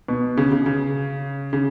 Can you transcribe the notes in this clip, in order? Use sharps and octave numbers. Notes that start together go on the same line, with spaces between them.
B2
C#3
C#3
C#3
C#3